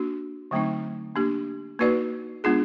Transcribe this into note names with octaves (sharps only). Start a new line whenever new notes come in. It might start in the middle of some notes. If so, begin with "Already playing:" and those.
Already playing: A#3 D4 F#4
D3 F#3 A3 C4 D#4
A#3 D4 G4
A#3 D#4 F#4 B4 D5
G#3 B3 D4 F4 G#4